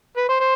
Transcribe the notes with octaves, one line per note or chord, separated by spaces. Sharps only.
B4
C5
C5